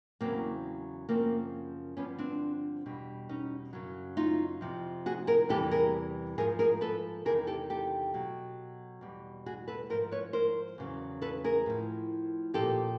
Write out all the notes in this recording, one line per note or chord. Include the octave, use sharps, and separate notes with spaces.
E2 C#3 F#3 A#3 C4
F#2 C#3 F3 A#3 C4
G2 D3 F3 B3 C#4
C4 D4
E2 B2 G3
C#4 D#4
F#2 C#3 F#3
D#4 F4
F2 C3 F3
F#4 G#4
G#4 A#4
E2 C3 E3 G3 G4 A4
G#4 A#4
G#2 F3 G#4 A#4
G#4 A#4
A4 B4
E2 C3 D#3 G#4 A#4
G4 A4
G4 A4
B2 F#3
E2 B2 G3
F#4 G#4
A4 B4
G#2 F3 A#4 C5
B4 C#5
A#4 C5
E2 C#3 F#3
A4 B4
G#4 A#4
A2 F3
A#2 F3 G4 A4